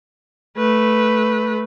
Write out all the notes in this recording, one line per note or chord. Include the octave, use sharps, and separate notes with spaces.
A3 B4